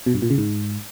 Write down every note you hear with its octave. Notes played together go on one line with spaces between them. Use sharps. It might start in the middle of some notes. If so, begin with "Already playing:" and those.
B2
G2
A#2
C#3
G#2